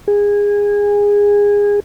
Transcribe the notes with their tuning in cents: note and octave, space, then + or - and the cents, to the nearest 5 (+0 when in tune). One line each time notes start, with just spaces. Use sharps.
G#4 -20